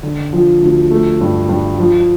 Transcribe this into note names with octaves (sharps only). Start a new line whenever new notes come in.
D3
F3
D2
A3
G2
G2
F3